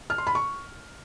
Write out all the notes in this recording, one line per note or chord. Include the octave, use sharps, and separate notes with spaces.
F6
C6
B5
C#6